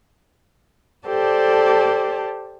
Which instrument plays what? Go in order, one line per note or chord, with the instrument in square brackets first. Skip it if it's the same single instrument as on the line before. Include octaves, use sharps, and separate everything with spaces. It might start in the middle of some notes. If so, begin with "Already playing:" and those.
[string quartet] G4 A4 C5 D5 A5